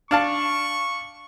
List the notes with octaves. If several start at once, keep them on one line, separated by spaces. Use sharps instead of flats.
D4 F5 A5 C#6